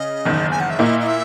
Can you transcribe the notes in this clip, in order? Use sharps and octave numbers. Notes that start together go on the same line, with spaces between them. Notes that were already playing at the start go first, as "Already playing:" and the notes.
Already playing: C#3 D#5
F#1 E2 D#3
G#5
F#5
E5
A#2 A#3 E4 D#5
D#5
E5